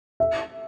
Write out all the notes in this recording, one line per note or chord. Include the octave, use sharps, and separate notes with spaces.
E5